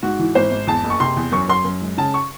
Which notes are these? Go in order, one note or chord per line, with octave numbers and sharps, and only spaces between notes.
G#2 F#4
E3
G#1 C5
G#1
E2 A5
F#1
C#6
C3 C6
E2
F#2 C#6
F#2 C6
F#2
G#3
C#3 A5
C#6